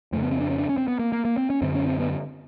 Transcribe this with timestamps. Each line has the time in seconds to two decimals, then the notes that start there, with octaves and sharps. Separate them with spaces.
0.12 F2 A3
0.16 C#3
0.22 B3
0.31 C4
0.40 D4
0.50 C#4
0.58 D4
0.69 C#4
0.77 C4
0.88 B3
0.99 A#3
1.12 A#3
1.25 A#3
1.37 C4
1.50 C#4
1.62 F#2 D3 C4
1.75 C#4
1.86 C4
2.00 B3